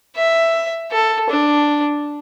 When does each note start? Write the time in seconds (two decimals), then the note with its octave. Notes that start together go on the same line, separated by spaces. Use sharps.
0.17 E5
0.92 A4
1.29 D4